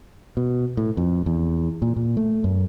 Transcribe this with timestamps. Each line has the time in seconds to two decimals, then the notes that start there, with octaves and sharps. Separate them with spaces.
0.37 B2
0.77 A2
0.97 F2
1.26 E2
1.82 A#2
1.96 A#2
2.17 A3
2.44 F#2